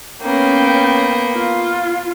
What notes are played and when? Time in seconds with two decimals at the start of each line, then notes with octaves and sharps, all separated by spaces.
0.22 A#3 B3 C#4 G5
1.35 F4